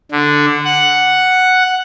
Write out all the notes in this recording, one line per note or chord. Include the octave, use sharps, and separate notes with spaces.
D3
F#5